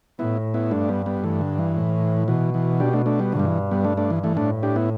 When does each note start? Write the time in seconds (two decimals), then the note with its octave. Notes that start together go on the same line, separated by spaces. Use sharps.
0.19 A2 B3 E4
0.54 B3 E4
0.71 G2 A3 D4
0.89 G3 B3
1.06 G3 B3
1.24 G2 E3 A3
1.41 D3
1.58 E3
1.76 A2
2.28 B2 E3
2.54 E3
2.80 D4 G4
2.93 A3 D4
3.06 A3 D4
3.19 G3 B3
3.32 G2 D3
3.39 G3
3.45 E3
3.71 G3 B3
3.84 A3 D4
3.97 A3 D4
4.10 E3
4.23 E3 A3
4.36 A2 A3 D4
4.63 D4 G4
4.76 B3 E4